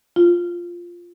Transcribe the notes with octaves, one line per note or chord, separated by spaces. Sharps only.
F4